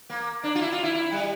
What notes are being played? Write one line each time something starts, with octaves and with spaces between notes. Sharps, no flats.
A#3
D4
F4
E4
F4
E4
E4
G3